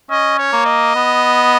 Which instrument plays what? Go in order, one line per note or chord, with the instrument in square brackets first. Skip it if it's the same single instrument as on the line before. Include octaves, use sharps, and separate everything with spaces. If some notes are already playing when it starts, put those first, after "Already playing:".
[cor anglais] C#4 [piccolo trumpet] D#5
[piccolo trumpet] C#5
[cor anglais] A#3
[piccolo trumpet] D#5
[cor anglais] B3